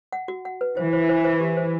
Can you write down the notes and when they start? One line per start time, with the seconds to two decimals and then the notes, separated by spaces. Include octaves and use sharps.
0.12 F#5
0.28 F#4
0.45 F#5
0.61 B4
0.77 E3 C5
0.93 C5
1.09 C5
1.24 C5
1.40 G4
1.57 C5